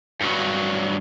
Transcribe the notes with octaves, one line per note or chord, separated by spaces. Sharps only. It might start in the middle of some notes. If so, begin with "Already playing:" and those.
G2 F#3